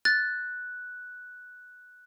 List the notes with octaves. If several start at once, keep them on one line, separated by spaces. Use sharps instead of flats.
F#6 A6